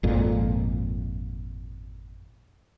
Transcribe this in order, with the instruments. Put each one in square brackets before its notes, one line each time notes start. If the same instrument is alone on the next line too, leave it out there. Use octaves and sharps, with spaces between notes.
[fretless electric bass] G#1 F2 A#2